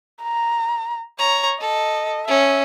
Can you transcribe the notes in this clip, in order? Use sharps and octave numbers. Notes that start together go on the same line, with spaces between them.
A#5
C#5 A#5
A4 D#5
C#4 E5